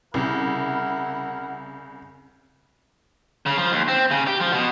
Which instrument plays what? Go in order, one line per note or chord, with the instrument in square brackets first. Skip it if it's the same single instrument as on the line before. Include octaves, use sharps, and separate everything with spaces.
[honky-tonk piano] C2 C#3 [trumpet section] E4 A#4 F#5
[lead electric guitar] C#3
F3
D#2
C4
C#3
G4
F3
B2